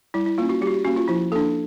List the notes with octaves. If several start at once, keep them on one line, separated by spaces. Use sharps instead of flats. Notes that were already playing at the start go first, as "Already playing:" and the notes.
G3 E4
E4
A#3 C#4 F4
F#4
G3 G4
F#4
G4
A#3 C#4 F#4
F4
F3 E4
A#3 D4 A4